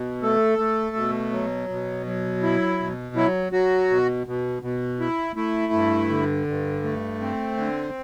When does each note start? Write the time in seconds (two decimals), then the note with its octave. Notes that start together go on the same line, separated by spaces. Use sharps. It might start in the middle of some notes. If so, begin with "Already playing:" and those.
Already playing: B2
0.22 A3 A4
0.59 A3
0.96 B2
1.32 F#3
1.69 B2
2.06 F#3
2.43 E4
2.80 B2
3.16 F#3 E4
3.52 F#3 F#4
3.90 B2
4.27 B2
4.62 B2
5.00 E4
5.36 A3 E4
5.73 G2
6.09 D3
6.47 G2
6.83 A3
7.21 C4
7.57 D3